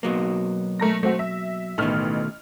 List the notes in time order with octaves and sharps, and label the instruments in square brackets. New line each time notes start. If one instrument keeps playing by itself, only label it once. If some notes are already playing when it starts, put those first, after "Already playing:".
[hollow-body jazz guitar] B2 F#3 A#3
[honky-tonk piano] A3 A#4 A#6
A3 C4 F#4
E5
[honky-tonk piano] A1 F6 [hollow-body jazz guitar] B2 D#3 A3